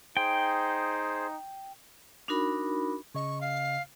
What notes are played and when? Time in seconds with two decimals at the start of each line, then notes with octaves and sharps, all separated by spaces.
0.17 D#4 G#4 C5 G5
2.28 D4 D#4 F#4 A#4 B5
3.15 C#3 D#5 C#6
3.41 F5